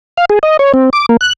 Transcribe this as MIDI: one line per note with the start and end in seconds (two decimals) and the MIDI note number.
0.17 0.25 77
0.30 0.39 68
0.43 0.57 75
0.59 0.72 73
0.74 0.90 60
0.93 1.06 86
1.09 1.17 58
1.21 1.33 90